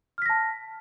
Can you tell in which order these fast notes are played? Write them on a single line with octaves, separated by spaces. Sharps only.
F6 B6 A#6 A5